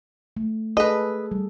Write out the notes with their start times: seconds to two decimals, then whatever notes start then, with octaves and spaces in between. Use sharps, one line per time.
0.37 A3
0.77 G#4 A4 B4 D#5
1.31 G3